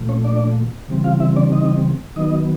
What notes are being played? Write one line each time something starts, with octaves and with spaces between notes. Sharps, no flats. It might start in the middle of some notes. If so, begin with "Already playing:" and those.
Already playing: A#2 F3 A3
C#4 C#5
D4 D5
C#3 E3 G3 C4
F4 F5
E4 E5
D4 D5
D#4 D#5
D#3 F#3 B3 D#4 D#5